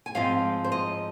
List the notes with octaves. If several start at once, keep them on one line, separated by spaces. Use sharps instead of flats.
G#5
G#2 F3 C4 F5
C5
D#5